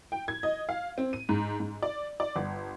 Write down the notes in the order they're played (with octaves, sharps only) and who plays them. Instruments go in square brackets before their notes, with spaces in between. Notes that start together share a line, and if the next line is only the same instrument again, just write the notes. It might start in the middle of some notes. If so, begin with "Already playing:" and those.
[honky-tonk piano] G5
G#6
D#5
F5
C4
D#7
G#2
G#2
D5
D5
G1